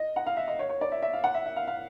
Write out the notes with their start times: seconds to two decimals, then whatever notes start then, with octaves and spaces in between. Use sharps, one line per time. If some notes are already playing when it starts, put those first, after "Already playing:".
Already playing: D#5
0.16 F#5
0.26 F5
0.37 E5
0.48 D#5
0.59 C#5
0.69 C#5
0.81 D5
0.92 E5
1.02 E5
1.13 F5
1.24 F#5
1.35 E5
1.46 E5
1.56 F5
1.67 F5